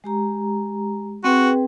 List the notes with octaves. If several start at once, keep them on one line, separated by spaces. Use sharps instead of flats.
G#3 G4 A#5
C4 F#4 G#4 B4 G5